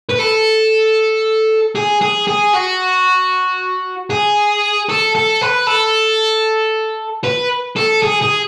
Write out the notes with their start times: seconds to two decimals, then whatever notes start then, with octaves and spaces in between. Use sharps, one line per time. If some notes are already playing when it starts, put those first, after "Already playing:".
0.09 B4
0.19 A4
1.76 G#4
2.02 G#4
2.28 G#4
2.54 F#4
4.10 G#4
4.89 A4
5.15 A4
5.41 B4
5.67 A4
7.24 B4
7.76 A4
8.02 G#4
8.21 G#4